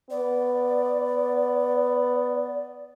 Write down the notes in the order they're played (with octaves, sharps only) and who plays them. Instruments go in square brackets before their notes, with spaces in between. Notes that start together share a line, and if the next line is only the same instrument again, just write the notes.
[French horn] B3 [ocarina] D5